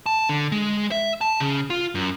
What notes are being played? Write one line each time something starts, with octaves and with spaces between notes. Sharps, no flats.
A5
D3
G#3
E5
A5
C#3
F4
F#2